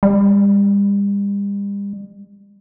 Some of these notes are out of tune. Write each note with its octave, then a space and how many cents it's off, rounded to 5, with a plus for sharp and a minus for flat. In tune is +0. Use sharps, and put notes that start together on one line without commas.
G3 +40